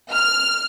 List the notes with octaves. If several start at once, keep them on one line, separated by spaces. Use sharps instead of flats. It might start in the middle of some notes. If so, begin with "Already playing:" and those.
F6